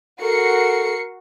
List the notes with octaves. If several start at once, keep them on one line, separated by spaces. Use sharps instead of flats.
F#4 A4 A#4 C7 C#7